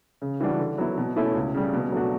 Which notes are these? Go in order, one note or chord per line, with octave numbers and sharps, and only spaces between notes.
C#3
E3 G3 D4 F#4
D3
F#3 B3 E4
B2
A3 C#4 E4
C#2
C#3 G3
B2
F#3 A3 D4 F#4